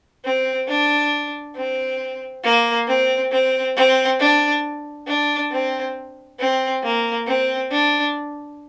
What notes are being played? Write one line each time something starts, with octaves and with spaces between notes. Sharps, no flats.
C4
D4
C4
A#3
C4
C4
C4
D4
D4
C4
C4
A#3
C4
D4